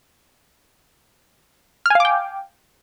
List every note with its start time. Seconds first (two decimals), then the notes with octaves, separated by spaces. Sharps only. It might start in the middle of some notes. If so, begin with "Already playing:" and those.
1.86 F6
1.90 G#5
1.95 F5
2.00 D6
2.05 G5